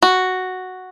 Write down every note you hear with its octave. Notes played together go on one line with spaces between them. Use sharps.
F#4